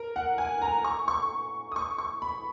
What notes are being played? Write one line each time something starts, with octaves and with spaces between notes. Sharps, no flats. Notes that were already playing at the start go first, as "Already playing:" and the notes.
Already playing: A#4
F#5
G#5
A#5
C#6
C#6
D#6
C#6
C#6
B5